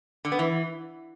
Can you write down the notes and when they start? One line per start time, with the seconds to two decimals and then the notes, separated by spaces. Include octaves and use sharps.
0.25 D3
0.32 B3
0.39 E3